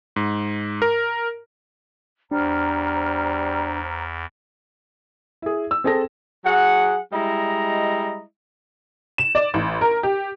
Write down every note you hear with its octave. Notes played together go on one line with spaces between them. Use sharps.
G#2
A#4
E2 G3 D4 C5 A#5 F6
E4 G#4
E6
C4 G#4 A4 C5 A5 A#6
F#3 G#4 F#5
G3 G#3 E4 D#5 A#5
E7
D5
A1
A#4
G4